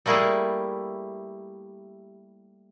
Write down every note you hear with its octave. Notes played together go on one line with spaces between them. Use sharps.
G3 A3 A#3 E4 G4 G#4